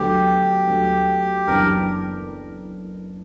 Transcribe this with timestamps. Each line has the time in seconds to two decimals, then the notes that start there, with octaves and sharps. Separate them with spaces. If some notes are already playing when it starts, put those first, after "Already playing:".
Already playing: D2 D3 F#3 B3 G4
0.67 D2 D3 F#3 B3
1.47 F#1 F#2 E3 B3 D4 A#4